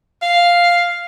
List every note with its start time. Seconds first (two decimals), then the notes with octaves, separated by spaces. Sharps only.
0.22 F5